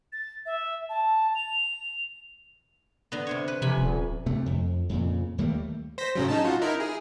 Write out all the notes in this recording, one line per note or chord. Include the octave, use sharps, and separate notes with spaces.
A6
E5
A5
F7
D3 B3
C3 C5 C#5
B4
F2 C3 G#5 B5
D#1
D2 C3 A3
F2
F2 A#2 C#3
D#2 G3 A3 A#3
C5 A#6 B6
A2 C#3 F#3
C#4 D#4 A5
F4 F#4
D#4 E4 A#4
G#4